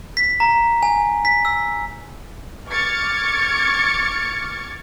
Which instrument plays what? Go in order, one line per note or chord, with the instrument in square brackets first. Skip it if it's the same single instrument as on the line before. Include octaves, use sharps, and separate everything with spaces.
[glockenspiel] B6
A#5
G#5
B6
E6
[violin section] C#6 D6 F6 G#6 A6 C#7